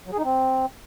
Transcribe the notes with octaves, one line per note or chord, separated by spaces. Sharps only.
F#3
G#4
D#4
C4